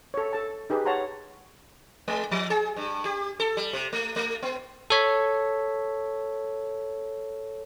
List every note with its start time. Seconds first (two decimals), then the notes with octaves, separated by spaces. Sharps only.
0.14 A4 C#5
0.33 A4 A5
0.70 D#4 G4 G#4 B4
0.85 C#5 F#5 A5 A#5 C6
2.08 G#3
2.31 F3
2.50 G#4
2.76 G2
3.05 G4
3.40 A4
3.57 G3
3.73 C3
3.93 A3
4.16 A3
4.43 B3
4.90 A4 C#5 B6